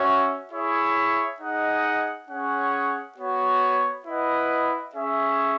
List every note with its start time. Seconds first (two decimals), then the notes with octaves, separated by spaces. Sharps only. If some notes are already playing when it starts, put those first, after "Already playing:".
Already playing: C#4 F#4 C#5 E5
0.52 E4 G#4 C#5 E5
1.41 D#4 G#4 D#5 F#5
2.29 C#4 G#4 C#5 F#5
3.18 B3 F#4 C#5
4.06 E4 B4 D#5 F#5
4.95 C#4 G#4 C#5 E5